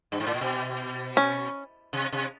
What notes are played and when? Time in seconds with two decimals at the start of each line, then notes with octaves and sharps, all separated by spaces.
0.12 G2
0.20 G#2
0.27 A2
0.34 A#2
0.41 B2
1.17 C#4
1.93 C3
2.12 C3